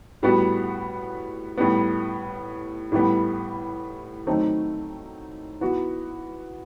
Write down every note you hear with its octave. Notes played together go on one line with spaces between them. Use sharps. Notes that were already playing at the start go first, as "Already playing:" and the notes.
A2 G3 B3 F#4
A2 G3 B3
A2 E3 G3 B3
D#3 F#3 A3 C4 D#4
E3 B3 F#4